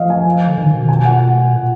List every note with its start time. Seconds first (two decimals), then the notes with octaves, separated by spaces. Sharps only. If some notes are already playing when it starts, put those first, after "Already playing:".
Already playing: F3 D#5 F5
0.10 G#5
0.47 D3
0.58 D#3
0.74 B2
0.89 G#5
1.05 F#5
1.53 A#2